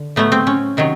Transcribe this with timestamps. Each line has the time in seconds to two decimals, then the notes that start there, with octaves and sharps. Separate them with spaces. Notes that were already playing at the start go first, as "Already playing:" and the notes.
Already playing: D3
0.16 A2 F#3 A3 B3
0.32 C4
0.47 C#4
0.77 C3 D#3 F#3